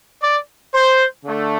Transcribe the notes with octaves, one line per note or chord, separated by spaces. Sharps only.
D5
C5
D3 A3